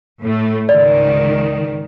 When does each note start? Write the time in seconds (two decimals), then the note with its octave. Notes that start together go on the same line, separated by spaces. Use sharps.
0.21 A2 A3
0.69 C#2 G#2 D#3 D5